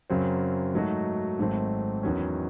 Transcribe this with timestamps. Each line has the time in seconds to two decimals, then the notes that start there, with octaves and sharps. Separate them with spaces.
0.10 F#2 C#3 F#3 C4
0.74 G#2 F#3 A3 D#4 F#4
1.39 G#1 G#2 F#3 A3 C4
2.03 E2 D#3 F#3 C#4